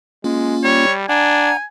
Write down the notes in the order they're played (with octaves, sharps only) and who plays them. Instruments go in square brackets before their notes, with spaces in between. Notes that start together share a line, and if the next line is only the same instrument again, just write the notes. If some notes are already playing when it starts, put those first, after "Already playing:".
[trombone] G#3 [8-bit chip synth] A#3 C#4 F4
[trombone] G3 [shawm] C#5
[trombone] D4 [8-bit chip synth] F#5 A#5 [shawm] G#5